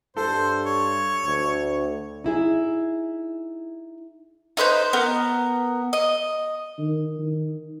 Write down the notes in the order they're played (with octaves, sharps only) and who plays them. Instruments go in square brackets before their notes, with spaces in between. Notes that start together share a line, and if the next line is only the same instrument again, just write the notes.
[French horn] G2 [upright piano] A4 [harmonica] C5
[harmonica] C#5
[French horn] D2
[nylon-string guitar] D#4 E4 G#4
[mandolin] D#4 B4 C5 G6
B3 A#4
D#5
[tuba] D#3
D#3